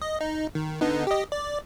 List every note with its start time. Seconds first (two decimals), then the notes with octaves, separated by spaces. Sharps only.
0.02 D#5
0.21 D#4
0.55 D#3
0.81 D3 B3 D#4
1.07 G4 D#5
1.32 D5